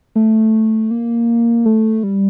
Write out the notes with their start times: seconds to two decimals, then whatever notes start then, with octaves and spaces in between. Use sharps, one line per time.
0.16 A3
0.91 A#3
1.66 A3
2.03 G3